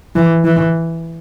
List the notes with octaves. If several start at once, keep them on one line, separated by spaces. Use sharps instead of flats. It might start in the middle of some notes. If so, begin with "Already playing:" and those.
E3
E3